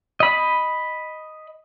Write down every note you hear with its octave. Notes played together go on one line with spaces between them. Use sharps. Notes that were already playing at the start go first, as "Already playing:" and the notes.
D#5 B5